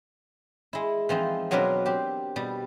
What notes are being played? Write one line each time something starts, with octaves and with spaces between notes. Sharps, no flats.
G#3 E4
E3 F3 C4 D#4
B2 F#3 C4 D4 A#4 B4
C4 G4
B2 G3